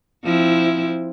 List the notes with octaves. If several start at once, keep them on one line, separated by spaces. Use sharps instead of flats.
F3 C4 E4